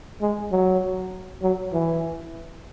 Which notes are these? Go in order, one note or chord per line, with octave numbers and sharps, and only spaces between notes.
G#3
F#3
F#3
E3